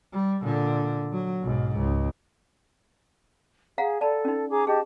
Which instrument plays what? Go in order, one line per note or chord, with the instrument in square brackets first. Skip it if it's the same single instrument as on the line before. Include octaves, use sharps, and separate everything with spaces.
[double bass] G3
A#2 D3
F#3
B1 G#2
C#2
[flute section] G#4 [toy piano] F5 F#5 A#5
[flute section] A4 [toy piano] D5 A5 B5
[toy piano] C#4 D#4
[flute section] G#4 A#5 D6
[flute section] G4 D#5 A5 [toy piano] G#4